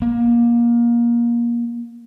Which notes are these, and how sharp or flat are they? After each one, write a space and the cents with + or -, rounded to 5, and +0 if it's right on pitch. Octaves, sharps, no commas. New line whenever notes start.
A#3 +25